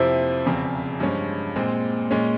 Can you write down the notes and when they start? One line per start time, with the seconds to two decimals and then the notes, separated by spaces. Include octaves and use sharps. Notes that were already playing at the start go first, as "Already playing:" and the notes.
Already playing: F2 C3 F3 C4 E4
0.45 E1 E2 C#3 F3 C4
1.00 G2 F3 G#3 C#4
1.56 A#2 G#3 C4
2.11 A#2 G#3 C#4